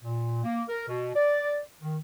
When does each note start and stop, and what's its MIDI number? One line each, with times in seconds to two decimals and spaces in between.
0.02 0.40 46
0.44 0.63 58
0.69 0.86 70
0.89 1.14 47
1.15 1.58 74
1.82 1.96 51